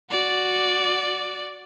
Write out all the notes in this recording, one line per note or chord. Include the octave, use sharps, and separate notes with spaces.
F#4 D5